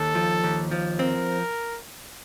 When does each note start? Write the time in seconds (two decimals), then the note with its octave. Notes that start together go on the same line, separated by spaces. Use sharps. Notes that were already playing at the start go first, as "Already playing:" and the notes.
Already playing: D#2 A4
0.15 F3
0.44 D#2
0.71 F3
0.99 C4 A#4